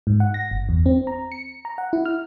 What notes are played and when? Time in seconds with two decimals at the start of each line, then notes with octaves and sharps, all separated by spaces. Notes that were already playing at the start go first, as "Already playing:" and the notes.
0.07 G#2
0.20 F#5
0.34 A#6
0.51 G1
0.69 E2
0.86 C4
1.07 A#5
1.32 C#7
1.65 A#5
1.78 F#5
1.93 E4
2.06 F6